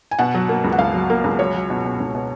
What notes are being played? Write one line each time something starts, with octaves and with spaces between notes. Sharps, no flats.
G#5
B2 F#5
F#3
A#3
C#2
F#5
C#2 F5
F#3
A#3
C#2
F#3 C#5
F#3
B2
B2
C#2
B2